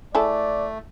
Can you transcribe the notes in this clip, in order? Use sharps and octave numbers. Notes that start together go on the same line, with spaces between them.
A3 E4 G#4 A4 D5